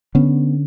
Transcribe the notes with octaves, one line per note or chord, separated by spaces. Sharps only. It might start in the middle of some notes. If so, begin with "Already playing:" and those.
D3 B3 C#4